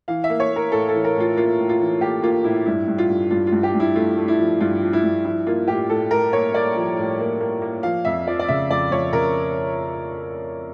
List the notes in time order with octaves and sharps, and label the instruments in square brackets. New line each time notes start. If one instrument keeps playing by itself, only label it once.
[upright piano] E3 F5
E5
A#3
C#5
A#3
A#4
A2 A4
A4
E3
A#4
A2 F4
A#3 F4
A2
F4
E3
A#3 G4
A#3 F4
A2 E4
G2 E4
G2
F4
G2
G2 F4
F4
G2
G4
G2
E4
A3 F4
A3
E4
F3
G2 F4
F3
E4
G2
F3 E4
A#3 F4
A2 G4
A2 A4
A2 A#4
A#3 C#5
A#3 D5
F3
A2
A#3
A#3
A#3
F3 F5
F2 E5
F3 D5
D5
C#3 E5
F2 D5
F2 C#5
C#3 A#4